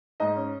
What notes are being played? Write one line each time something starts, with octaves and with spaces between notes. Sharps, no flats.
G#2 D#5
C#4